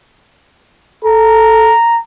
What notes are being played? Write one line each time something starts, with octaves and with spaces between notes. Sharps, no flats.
A4 A#5